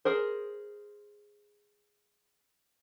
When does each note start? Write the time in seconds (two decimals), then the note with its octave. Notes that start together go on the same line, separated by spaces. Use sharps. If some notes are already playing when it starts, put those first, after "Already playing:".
0.05 G#4 A#4 C5